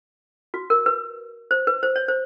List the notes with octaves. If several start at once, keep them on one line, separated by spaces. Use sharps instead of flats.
F#4
A#4
B4
C5
B4
C5
C#5
C5